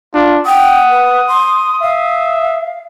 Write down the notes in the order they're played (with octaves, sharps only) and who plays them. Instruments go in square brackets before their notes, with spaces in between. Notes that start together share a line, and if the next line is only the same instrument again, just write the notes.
[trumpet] D4 [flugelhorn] F4
[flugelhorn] F#5 [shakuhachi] G5 [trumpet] D#6
[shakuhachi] B4
C6
[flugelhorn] E5 [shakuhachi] F5